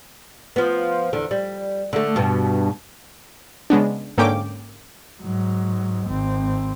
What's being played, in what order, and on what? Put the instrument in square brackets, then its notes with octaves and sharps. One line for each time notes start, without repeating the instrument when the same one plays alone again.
[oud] F3 B3
E2 D3
G3
D3 A3
G2 B2
[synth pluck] C#3 G#3 B3 D4
G#2 D3 A#3 C#4 G5 D6
[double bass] G#2 F#3
G#1 C4